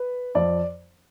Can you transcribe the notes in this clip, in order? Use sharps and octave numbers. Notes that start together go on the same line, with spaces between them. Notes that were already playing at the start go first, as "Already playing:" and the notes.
Already playing: B4
F2 F3 D5